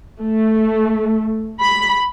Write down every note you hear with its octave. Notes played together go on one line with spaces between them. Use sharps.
A3
B5